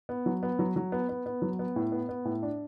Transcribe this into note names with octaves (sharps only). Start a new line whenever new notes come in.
B3
F#3
B3
F#3
F#3
B3
B3
B3
F#3
B3
A2
B3
B3
A2
D4